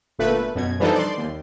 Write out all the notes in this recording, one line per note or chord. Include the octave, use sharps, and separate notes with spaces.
G1 A#2 A3 B4
F#2 B2 G#6
E3 F3 G3 D4 D#4 A4
D5 C6
D#2